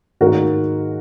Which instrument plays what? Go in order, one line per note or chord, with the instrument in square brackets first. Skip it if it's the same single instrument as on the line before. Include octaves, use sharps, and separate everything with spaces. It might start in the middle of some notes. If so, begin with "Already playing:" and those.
[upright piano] G#2 D#3 A#3 C#4 F#4 A#4